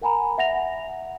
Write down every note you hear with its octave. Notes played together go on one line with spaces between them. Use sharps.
A#4 F#5 G#5 A#5 B5
E5 F#5 A#6 F7